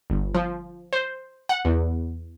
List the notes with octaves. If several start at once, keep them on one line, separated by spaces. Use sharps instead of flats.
G1
F3
C5
F#5
E2